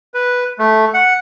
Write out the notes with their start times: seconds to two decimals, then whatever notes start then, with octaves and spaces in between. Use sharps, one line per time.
0.14 B4
0.59 A3
0.94 F#5